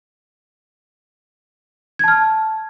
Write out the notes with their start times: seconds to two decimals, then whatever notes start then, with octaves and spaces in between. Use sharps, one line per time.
1.99 G#6
2.04 A5
2.08 F6